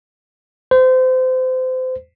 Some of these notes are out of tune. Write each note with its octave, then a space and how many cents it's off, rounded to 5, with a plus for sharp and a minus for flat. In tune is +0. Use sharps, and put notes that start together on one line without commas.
C5 -30